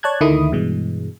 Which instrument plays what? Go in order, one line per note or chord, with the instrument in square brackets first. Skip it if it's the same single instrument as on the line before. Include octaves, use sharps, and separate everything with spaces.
[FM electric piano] C#5 D5 A5 F#6 G#6
D2 D#3 A3 E4 B5 D#6
G2 B2 E3 G#3